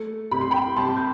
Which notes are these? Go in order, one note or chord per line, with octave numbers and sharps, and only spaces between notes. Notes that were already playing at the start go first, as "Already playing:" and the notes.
Already playing: A3
C3 B5
C6
G5 B5
C3 A5 C6
G6